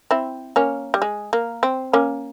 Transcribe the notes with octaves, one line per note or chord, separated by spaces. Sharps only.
C4 E4
A#3 C#4
G3
G#3
A#3
C4
A#3 C#4